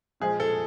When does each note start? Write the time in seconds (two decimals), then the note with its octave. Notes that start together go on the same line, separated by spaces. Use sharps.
0.20 A#2 F3 G#3 G#4
0.40 A4